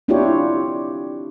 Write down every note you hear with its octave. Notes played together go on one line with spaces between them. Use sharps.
C4 D4 E4 F4 G4 C#5